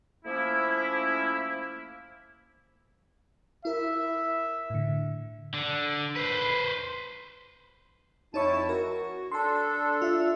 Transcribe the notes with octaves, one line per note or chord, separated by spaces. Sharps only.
F3 A3 A#3 C#4 E4
E4 A#4 E5
A2 D3
D3
B4 C5
F2 D#4 E4 C#5 A5 C#6
F#4 A#4
D4 A4 A5 C6
F4 E5